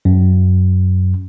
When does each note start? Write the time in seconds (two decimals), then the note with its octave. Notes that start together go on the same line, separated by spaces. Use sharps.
0.05 F#2